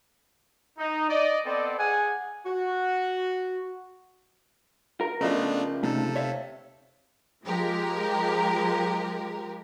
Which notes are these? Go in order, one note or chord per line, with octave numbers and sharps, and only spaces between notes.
D#4
D5 D#5
B3 C4 A4 D5 D#5
G#4 F#5 G#5
F#4
A#4
C#3 F3 A3 B3 D4 A#4 D#5
C3 A3 D#4 A4
C#5 E5 F5
F3 G#3 G4 A#4